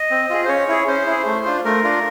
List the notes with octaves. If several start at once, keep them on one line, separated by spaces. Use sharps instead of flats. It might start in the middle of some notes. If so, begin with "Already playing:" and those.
Already playing: D#5
C4
F4 G#4
C5
C#4 C#5
E4 G#4
C#4 C5
E4 G#4
A3
D4 F4
A3 A#4
D4 F4